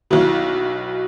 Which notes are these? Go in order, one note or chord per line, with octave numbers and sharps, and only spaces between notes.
B1 B2 E4